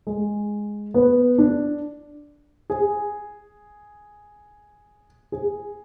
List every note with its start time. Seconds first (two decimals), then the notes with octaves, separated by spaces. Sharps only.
0.07 G#3
0.94 B3
1.38 D4
2.70 G#4
5.32 G#4